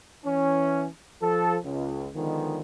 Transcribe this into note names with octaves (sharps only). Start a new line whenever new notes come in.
E3 C#4
F3 A4
C#2
D3 D#3 F3 G#3 B3